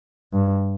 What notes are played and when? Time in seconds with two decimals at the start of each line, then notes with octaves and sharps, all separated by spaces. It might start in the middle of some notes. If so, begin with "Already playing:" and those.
0.33 G2